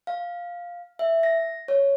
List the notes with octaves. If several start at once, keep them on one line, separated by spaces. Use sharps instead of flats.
F5
E5
A#6
C#5